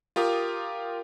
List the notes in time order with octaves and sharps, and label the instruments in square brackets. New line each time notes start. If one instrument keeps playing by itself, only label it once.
[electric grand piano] F4 G4 A#4 D#6